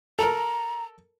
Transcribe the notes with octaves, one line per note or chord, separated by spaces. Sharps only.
A4 A#4 A#5